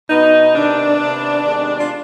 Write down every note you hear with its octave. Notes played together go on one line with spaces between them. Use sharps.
B2 B3 D#4
C3 D#3 B3 D4
C3 D#3 B3
C3 D#3 G#3 B3
F4